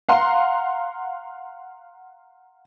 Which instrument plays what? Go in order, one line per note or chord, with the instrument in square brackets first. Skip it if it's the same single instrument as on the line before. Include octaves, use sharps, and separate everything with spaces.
[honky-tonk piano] F5 F#5 A#5 C6